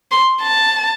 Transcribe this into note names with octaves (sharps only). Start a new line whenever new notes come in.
C6
A5